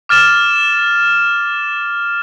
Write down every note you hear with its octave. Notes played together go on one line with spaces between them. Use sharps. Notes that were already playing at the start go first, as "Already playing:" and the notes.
D6 F6 A6 E7 G7